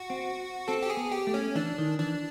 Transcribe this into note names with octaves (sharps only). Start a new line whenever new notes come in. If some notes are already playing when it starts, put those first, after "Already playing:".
Already playing: F#4
C4
C4 A4
G4
G#4
B3
G4
A3
C#4
E3 D4
D#3
E3 D4